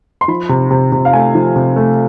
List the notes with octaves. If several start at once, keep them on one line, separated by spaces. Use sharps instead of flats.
C6
F3 B5
C3
C3
C3
F5
A3 G#5
F3
C3
A3